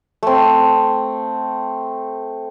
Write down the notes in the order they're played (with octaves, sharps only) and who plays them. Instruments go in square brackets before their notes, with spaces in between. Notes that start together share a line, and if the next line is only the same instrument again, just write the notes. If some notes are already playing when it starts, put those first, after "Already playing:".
[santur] A3 C4